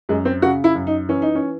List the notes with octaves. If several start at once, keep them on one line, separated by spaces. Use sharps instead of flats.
F#2 G#3
C4
C#3 F#4
E4
F#2
D#4
E3 C#4
D#4
C#4